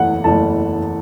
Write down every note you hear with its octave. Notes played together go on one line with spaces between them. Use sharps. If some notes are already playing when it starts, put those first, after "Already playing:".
Already playing: F#1 E2 E3 A3 F#5
F#1 E2 E3 A3 A5